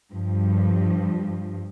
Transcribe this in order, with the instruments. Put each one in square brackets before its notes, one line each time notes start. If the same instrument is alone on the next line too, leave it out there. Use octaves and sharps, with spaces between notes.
[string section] G2 F3